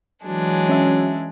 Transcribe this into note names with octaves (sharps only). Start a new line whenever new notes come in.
E3 F#3 G#3 D4
C#4 E5